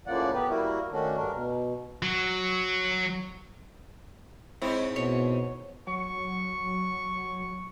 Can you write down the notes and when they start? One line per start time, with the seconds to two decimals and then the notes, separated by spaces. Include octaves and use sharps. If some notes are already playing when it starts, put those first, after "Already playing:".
0.07 A2 C#3 F3 A#3 D5 F#5
0.33 B3 G4 B4
0.50 G3 A#3 E4 F#4 A#4
0.92 D#3 A3 C#4 D4 F#4
1.17 G2 D4 A#4
1.33 B2
2.02 F#3
4.62 G#2 C4 E4 C#5
4.96 B2 C#5
5.87 F#3 C#6